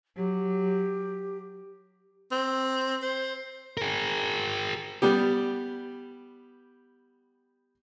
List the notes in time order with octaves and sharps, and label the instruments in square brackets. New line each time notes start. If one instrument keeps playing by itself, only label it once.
[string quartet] F#3 [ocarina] G4
[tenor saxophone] C4
C5
[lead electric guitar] G#4 A#4
[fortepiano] G3 B3 G4